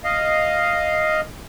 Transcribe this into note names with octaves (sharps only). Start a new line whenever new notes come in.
D#5 F5